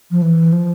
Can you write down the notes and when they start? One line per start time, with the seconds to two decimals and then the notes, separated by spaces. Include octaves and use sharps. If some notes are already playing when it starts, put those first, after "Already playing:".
0.11 F3
0.22 E3
0.53 F3